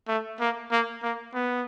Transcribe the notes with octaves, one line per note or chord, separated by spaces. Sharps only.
A3
A#3
A#3
A#3
B3